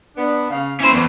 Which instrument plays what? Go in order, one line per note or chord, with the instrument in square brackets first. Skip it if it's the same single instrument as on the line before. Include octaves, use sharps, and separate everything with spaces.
[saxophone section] B3 D4
C#3 F5
[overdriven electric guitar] C#4 C5 [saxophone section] E4
[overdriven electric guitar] E2 [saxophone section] A2 D4 A#4